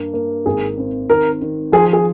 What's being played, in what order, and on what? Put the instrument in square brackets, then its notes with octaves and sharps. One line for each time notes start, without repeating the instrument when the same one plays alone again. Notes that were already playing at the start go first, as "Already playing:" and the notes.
Already playing: [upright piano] G2 A#3
A#3
[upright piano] G#1 [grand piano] G#4
[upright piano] C4
[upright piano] D#3 [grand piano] A#4
[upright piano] D#3
[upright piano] F3 [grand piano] G#4
[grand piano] G#4